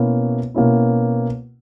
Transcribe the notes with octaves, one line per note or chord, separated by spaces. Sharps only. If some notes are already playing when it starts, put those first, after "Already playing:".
Already playing: B2 A#3 C#4 E4
B2 A#3 C#4 E4